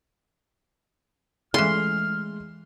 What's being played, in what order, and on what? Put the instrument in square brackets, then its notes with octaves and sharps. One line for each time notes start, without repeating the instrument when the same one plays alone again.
[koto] E3 C#4 F4 [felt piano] G#3 A3 G#4 [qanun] C6 [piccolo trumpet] F6